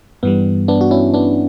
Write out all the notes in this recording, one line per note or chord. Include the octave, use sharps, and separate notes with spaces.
G2 E3 G3 B3
B3 D4
F#4
C#4 E4
B3 D4